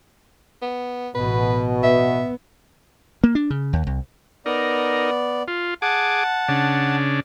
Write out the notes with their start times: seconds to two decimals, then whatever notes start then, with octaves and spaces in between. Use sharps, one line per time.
0.62 B3
1.15 A1 B2 B4
1.83 B3 E5
3.24 A#3
3.35 D4
3.50 C#3
3.73 D#2
3.87 C2
4.46 B3 D#4 A#4 D5
5.48 F4
5.82 G#4 F#5 A5 D6
6.48 C#3 D4